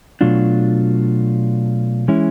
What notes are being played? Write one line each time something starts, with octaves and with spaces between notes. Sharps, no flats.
B2 F#3 A3 D4 F4
E3 G#3 C#4 E4